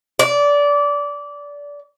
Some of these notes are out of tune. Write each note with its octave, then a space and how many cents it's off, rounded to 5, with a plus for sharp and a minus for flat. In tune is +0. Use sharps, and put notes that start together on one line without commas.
D5 -20